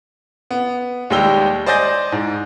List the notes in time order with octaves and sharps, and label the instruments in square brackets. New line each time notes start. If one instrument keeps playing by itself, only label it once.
[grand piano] B3
D#2 G3 G#3 G4 E6 G7
C5 D5 D#5 G#5 G6 A#6
G#2